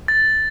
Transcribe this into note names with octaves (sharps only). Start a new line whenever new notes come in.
A6